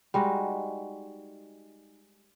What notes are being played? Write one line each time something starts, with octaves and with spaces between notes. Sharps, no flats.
G3 G#3 D#4 F#4